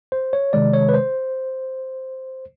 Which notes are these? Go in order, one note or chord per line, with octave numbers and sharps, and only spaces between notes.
C5
C#5
C3 D#3 G#3 D5
C#5
B4
C5